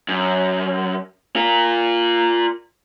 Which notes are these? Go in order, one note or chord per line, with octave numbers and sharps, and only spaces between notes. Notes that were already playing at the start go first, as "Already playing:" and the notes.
F#2
F4 A#4